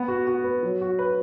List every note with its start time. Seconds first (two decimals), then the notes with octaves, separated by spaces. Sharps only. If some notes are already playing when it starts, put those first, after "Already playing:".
Already playing: B3
0.08 F#4
0.27 F#4
0.44 B4
0.63 F#3
0.81 F#4
0.99 B4